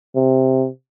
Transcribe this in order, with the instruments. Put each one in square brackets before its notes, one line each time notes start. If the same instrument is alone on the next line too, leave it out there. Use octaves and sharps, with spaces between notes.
[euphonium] C3